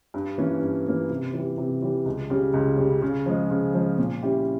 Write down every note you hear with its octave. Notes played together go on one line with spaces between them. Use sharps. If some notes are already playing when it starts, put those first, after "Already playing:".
G2
E3 A#3 C#4
G2
E3 A#3 C#4
C3
E3
G3
C3
E3 G3
C#2
C#3 G3
C#2
C#3 G3
C#3
F3 G#3
C#3
F3 G#3
A#2
G3 C#4 E4 G4